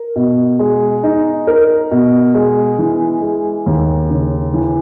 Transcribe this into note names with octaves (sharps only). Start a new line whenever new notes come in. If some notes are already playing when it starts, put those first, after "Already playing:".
Already playing: A#4
B2
G#3
D#4
A#4
B2
G#3
E3
G#3
D#2
C#3
E3